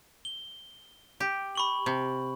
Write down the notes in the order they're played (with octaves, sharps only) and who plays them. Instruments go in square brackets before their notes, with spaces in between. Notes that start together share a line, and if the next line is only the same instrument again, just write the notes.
[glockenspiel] G7
[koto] G4
[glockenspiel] B5 C#6 F#7
[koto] C3